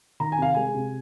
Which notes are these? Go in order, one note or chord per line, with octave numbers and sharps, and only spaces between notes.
D#3 A#5
G#5
C3 F5
G#3 G#5
C3